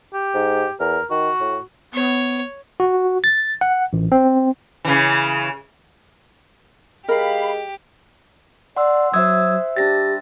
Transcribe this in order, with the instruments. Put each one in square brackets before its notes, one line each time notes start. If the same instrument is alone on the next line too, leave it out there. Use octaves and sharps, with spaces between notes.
[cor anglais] G4
[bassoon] G#2
[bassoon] E2 [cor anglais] A#4
[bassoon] D#3 [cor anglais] F#4
[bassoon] A2
[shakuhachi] B3 [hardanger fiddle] C#5
[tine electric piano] F#4
A6
F#5
A1
C4
[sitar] C#3 E3
[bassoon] G#3 [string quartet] G4 [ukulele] A#4 [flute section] F5 B5
[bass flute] D5 [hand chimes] F#5 C6 E6
[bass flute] F#3 [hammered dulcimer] C5 E5 F#5 [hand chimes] D#6 E6 G#6
[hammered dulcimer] G3 D4 [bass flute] G4 [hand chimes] A6 A#6